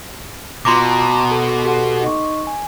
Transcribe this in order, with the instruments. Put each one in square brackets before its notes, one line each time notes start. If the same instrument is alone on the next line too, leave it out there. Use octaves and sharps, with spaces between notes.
[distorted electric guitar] B2 [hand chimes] F4 A#5 A#6 [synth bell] C6 D6
[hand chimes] A#5
A4
G4 A4 F#5
D#4 D#5 C#6
G#5